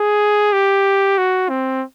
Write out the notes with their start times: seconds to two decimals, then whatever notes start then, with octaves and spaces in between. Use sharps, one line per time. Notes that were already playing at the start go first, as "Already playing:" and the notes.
Already playing: G#4
0.53 G4
1.18 F#4
1.49 C4